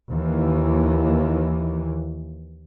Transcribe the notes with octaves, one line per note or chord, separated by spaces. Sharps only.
D#2 E3